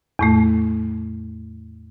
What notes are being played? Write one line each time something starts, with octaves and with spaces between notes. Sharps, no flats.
E2 A2 A3